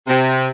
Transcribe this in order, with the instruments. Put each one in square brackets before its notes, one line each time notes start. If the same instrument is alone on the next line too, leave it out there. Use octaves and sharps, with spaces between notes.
[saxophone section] C3